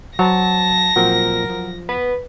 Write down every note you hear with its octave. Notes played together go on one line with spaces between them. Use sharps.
F#3 C5 C#5 A5 A#6
A#2 F3 F#3 C4 A#4
F3
B3 B4